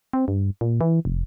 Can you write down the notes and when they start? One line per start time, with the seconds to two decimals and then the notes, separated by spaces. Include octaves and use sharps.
0.13 C4
0.28 G2
0.61 A#2
0.81 E3
1.05 F1